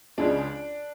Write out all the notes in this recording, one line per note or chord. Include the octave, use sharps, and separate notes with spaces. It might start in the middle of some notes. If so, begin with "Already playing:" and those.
C#2 C#3 F3 G#3 D4